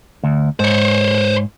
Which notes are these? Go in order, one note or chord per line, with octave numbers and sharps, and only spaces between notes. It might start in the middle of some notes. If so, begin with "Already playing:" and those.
D2
G#2 C5 C#5